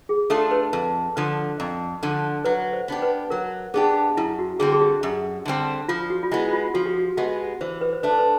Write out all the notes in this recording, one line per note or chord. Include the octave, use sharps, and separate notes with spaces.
G#4
A3 D4 F4 A4
B4
F2
D3 F3
F2
D3 F3
F#3 B4
C5
B3 D4 G4
B4
F#3 A#4
B3 D4 G4 G#4
F#2 E4
F#4
D3 G3 C4 G#4
G#4
G4
F#2
D3 G3 C4
F3 F4
F#4
F4
G#3 B3 E4
F4
F3 F#4
G4
F#4
G#3 B3 G4
E3 C5
B4
C5
A3 D4 B4
B4